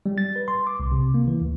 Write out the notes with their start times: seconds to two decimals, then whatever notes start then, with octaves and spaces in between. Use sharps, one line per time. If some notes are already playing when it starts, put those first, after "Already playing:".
0.06 G3
0.18 A6
0.36 B4
0.48 C6
0.67 D6
0.80 C2
0.91 C3
1.14 A#3
1.27 E3
1.41 D2